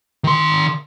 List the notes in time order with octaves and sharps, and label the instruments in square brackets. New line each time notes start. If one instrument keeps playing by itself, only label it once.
[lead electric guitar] D#3 C6